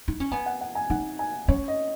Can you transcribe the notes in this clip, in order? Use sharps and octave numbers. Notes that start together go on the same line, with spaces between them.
D#4
C#4
B3 G#5
F#5
F#5
G#5
D#4 F#5
G#5
C#4 C#5
D#5